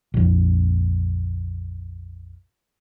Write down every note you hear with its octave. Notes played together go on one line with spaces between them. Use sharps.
A#1 F2